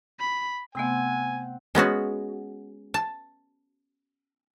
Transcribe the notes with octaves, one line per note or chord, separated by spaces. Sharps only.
B5
C3 A3 B3 C4 F#5 G#5
G#3 B3 C#4 F#4
A5